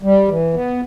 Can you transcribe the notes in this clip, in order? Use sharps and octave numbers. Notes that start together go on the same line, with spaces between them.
G3
E3
B3